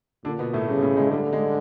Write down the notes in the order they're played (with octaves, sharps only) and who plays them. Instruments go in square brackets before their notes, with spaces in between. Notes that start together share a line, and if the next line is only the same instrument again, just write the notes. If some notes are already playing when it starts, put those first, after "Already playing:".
[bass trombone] A#2 [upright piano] D3 D4
[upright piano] B2 B3
A2 A3
[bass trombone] C#3 [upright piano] G3
[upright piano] A2 A3
G#3
[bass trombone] D3 [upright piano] G3
[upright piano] G#3